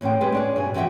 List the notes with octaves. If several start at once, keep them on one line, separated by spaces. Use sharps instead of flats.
E2 A2 C#4 C5 G5
G#3 G4 G#4 B4
C#4 D4 G#4
G2 B2 G#5
E3 F3 F#4 E5 G5